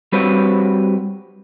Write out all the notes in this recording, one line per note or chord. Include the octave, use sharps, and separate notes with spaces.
G3 C4 F#4 B4 C#5